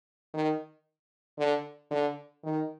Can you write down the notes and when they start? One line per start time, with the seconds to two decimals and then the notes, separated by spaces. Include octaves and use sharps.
0.34 D#3
1.38 D3
1.91 D3
2.44 D#3